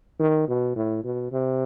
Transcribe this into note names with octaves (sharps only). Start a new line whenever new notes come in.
D#3
B2
A2
B2
C3